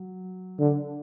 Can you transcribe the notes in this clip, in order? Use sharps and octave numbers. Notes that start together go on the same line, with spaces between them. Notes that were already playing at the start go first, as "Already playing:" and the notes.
Already playing: F#3
D3